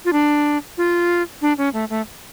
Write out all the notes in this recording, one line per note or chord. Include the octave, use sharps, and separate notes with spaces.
F4
D4
F4
D4
C#4
A3
A3